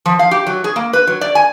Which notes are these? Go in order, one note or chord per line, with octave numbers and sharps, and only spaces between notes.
F3
F5
G4
F#3
G#4
A#3
B4
F#3
D5
G#5